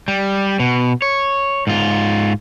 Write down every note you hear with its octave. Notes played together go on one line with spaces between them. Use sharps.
G3
B2
C#5
G#2 F4